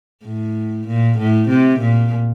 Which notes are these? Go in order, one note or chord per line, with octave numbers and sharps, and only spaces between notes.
A2
A#2
A2
C3
A#2